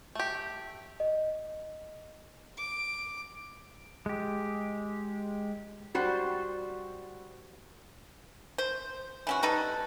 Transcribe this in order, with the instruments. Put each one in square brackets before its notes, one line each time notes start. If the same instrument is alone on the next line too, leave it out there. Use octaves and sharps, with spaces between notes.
[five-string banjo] A3 G4
[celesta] D#5
[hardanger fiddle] D6
[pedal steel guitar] G#3 G4
[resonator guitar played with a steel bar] G3 F#4 C5
[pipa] C5
E3 C#4 F#4
G3 D#4 A4 B4